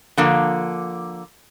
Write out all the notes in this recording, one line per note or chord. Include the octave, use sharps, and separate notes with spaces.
D3 F3 A#3